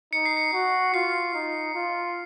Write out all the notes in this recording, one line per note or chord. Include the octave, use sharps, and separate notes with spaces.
D#4 C#7
C7
C#7
F#4
F4 C7
D#4
F4